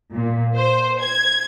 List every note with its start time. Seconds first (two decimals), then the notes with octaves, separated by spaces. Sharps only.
0.14 A#2
0.57 C5
1.01 G#6